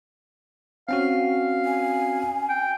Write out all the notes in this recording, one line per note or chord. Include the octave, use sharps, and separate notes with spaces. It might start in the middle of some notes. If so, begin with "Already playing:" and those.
C4 C#4 F#4 F5
G#5
G5